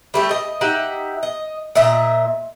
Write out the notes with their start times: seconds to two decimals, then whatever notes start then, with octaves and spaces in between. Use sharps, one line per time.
0.14 G3 A3 G4
0.31 D#5
0.61 D#4 G4 E5 F#5
1.23 D#5
1.75 A#2 D#5 E5 A#5